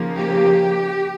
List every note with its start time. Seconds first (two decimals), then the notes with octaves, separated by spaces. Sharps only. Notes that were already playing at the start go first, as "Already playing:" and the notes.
Already playing: C#3 F3 A#3 D#4
0.17 G4